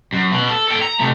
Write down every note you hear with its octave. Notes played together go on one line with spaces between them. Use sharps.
F#2
B2
A4
A4 G5
A#5
C3 A3